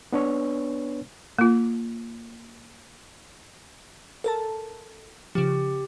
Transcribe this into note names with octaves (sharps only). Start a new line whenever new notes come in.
B3 D4 B4 C#5
A#3 F4
A4 A#4 A5
C#3 F3 G4